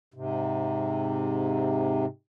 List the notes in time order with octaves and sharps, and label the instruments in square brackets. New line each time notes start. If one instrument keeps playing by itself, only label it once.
[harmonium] G#2 C3